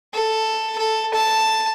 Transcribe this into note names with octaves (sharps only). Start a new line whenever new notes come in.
A4
A4
A5